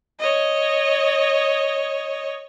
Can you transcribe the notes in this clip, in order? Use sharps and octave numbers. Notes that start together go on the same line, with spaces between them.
C#5 D#5